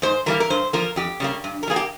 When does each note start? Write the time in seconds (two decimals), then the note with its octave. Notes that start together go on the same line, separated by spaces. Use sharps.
0.02 G#2 C5
0.26 E3 G3 A#3 A#4
0.40 A#4
0.50 G2 C5
0.73 F3 A#3 A#4
0.96 F2 G4
1.20 C#3 G3 A#3
1.44 G2
1.63 A#4
1.67 G3 A#3 G#4
1.76 G4